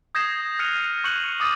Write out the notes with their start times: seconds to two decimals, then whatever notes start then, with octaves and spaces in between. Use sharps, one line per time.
0.15 D#6 G6 G#6 A#6 C7 E7
0.59 F6 F#6 A#6 C#7 D#7 F7
1.04 C#6 F#6 G6 C#7 F#7
1.40 D6 D#6 A6 C#7 D#7